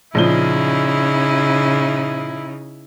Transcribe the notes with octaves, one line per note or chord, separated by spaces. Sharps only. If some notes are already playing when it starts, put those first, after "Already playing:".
A#1 C#3 F3 D#4 E4 G7